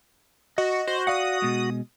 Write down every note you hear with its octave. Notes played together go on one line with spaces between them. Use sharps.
F#4 D#5
F#4 C5
D5 F5 F#5 D#6
B2 G#3